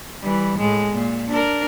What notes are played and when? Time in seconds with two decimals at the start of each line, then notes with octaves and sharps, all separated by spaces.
0.20 E3 G3
0.58 A2 G#3
0.93 A#2
1.29 D4 A#4